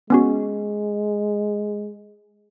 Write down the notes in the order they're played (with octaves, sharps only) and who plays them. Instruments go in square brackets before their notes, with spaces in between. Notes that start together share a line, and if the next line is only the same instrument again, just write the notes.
[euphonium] G#3 [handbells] B3 C#4 F#4